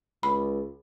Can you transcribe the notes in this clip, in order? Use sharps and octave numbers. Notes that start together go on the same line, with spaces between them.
C#2 B5